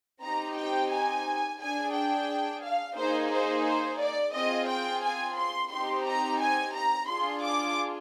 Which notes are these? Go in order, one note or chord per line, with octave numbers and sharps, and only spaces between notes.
C4 D#4 G4 A#5
G5
G#5
D4 G#4 G#5
G5
F5
A#3 D#4 G#4 C5
C5
C5
D5
C4 F4 G#4 D#5
G5
G#5
C6
C4 D#4 G4 C6
A#5
G#5
A#5
D4 F4 G#4 C6
D6